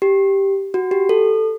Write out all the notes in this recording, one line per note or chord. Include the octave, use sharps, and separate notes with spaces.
G4
F#4
G4
A4